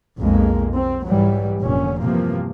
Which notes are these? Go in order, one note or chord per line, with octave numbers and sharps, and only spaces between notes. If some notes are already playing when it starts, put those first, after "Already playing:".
B1 F2 G#3 A#3
C4
G#2 E3 F#3 G3
F1 A#2 D3 C#4
E2 G2 C3 F3 A#3